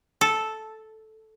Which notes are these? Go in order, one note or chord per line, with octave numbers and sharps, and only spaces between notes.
A4